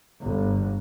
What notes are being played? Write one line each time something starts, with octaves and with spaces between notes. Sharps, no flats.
G1